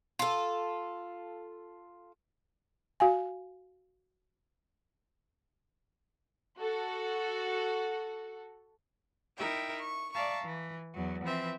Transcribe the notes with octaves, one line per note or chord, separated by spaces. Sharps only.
F4 A4
F#4 F5 G#5
F#4 A4
D#4 E4 A#4 E5 G5
C#6
D5 E5 F5 A5 A#5 C#6
E3
E2 F#3
E3 F3 C4 B4 E5